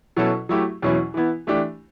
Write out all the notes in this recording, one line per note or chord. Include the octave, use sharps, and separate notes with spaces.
B2 F#3 C#4 E4 A4
F#3 A3 E4 G4
E2 B2 F#3 C#4 E4
E3 B3 E4
E3 A3 D4 G4